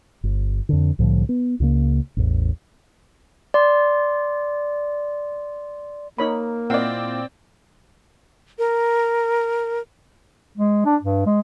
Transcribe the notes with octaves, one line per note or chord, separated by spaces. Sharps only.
G1
F2 D3
C2 A2 D3 F3
B3
C#2 C#3 A#3
A1 E2
D5 C6
A#3 D#4 C#5 B5
A#2 C4 E4 D5 D#5 F5 F#5
A#4
G#3
D4
G2
G#3